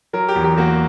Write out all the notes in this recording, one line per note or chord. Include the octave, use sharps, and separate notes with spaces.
F#3 A#4
G4
E2
G4
A#3 F#4